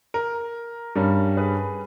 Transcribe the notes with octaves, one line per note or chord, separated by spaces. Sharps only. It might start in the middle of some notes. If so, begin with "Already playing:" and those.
A#4
G2 G3 C#4 A#4
G#4 B4